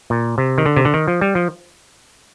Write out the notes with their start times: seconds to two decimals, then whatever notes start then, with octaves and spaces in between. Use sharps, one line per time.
0.10 A#2
0.38 C3
0.58 D#3
0.66 D3
0.76 C3
0.85 D3
0.94 D#3
1.08 F3
1.21 G3
1.35 F3